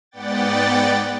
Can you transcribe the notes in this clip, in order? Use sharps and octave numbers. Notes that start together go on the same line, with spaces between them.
G#2 B3 D5 F#5 G5 A6